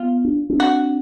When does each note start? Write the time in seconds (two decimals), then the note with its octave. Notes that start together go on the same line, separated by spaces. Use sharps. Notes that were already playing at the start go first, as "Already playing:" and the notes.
Already playing: B3 F4
0.25 D4
0.50 C4 D4
0.60 F#4